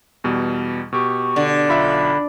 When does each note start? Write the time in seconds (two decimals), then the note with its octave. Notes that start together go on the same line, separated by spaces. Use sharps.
0.24 E2 B2 G3
0.93 B2 G4 C#6
1.36 D3
1.69 B1 F4 E5 B5